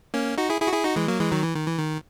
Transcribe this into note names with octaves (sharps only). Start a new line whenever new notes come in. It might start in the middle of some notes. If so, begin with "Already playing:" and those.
A#3 C#4
D#4 F#4
E4 G#4
E4 G#4
F#4
E4 G#4
D#4 F#4
E3 G#3
F#3 A#3
E3 G#3
D#3 F#3
E3
D#3
E3
D#3